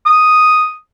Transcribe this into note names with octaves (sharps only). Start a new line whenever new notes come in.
D#6